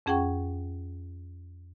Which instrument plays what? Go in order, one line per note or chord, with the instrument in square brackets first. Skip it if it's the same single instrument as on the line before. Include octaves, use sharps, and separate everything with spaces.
[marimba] F2 C#4 G#4 F#5 G5 C#6